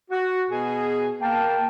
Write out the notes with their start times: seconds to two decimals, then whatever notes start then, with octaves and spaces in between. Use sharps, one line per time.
0.10 F#4
0.51 B2 G#4
1.21 A#3 G5 A5